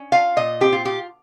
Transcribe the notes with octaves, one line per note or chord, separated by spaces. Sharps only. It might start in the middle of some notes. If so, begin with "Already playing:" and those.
Already playing: C#4
F4 F5
A#2 D#5
C4 G4
F4
F4 G4